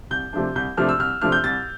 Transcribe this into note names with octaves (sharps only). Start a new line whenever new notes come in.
C2 G6
C3 F3 A3 D4
C2 G6
C3 F3 A3 D4 F6
E6
C2 F6
C3 F3 A3 D4 F6
G6
C2 A6